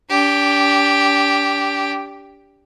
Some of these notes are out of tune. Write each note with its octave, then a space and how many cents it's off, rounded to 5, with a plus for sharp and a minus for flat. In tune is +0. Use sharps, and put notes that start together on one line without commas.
D4 -35 G4 +0